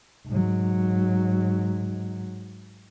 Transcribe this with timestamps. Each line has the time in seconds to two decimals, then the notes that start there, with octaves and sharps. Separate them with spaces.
0.28 G#2 F#3